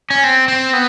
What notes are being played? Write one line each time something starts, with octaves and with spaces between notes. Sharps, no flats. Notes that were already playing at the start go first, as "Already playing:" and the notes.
C#4
C4
C4
B3